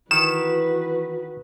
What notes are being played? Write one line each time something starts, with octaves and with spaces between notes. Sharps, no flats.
D#3 E3 F#4 B4 E7